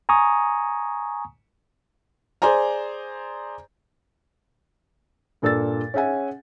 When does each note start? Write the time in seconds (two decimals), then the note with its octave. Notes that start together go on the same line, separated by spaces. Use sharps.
0.09 G#5 A#5 C#6 D#6
2.42 G#4 C5 D5 G#5 A#5
5.42 G2 A#2 A4 D5 E6 A6
5.94 C#4 G#4 E5 F#5 G#5